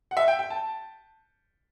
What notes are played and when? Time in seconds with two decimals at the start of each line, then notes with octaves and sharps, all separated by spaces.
0.11 F#5
0.17 E5
0.28 G5
0.39 G5
0.50 A5